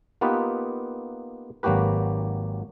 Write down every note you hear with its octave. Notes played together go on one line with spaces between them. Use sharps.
A#3 B3 D#4 F4 G4 B4
G#1 F#3 A#3 F#4 G4 B4